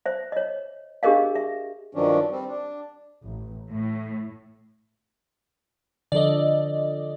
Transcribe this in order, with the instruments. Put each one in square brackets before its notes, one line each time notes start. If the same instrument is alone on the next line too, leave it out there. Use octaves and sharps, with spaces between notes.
[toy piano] C5 E5
C#5 D#5
D4 G4 G#4 A#4 D#5 F5
E5
[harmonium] G2 D#3 F3 F#3 C#4 D4
G3 C4
D4
[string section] A1
A2
[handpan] D3 F3 A4 [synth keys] D5 D#5